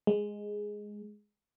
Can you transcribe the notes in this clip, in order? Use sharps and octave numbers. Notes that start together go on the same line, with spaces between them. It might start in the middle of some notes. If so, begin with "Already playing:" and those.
G#3